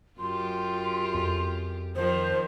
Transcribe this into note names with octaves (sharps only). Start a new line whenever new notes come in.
F#2 F4 G4 C6
F2
D#3 F3 D#4 C5